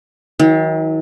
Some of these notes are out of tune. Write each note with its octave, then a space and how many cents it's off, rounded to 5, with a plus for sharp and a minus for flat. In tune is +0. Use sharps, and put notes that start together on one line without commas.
D#3 +45 F#3 +0